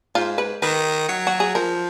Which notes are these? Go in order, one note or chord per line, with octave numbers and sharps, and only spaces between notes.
G#2 F4
B4
D#3 B4
F#3
F#4
G#4
F3 A#4